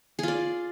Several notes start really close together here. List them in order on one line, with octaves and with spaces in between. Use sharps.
G#4 F4 D5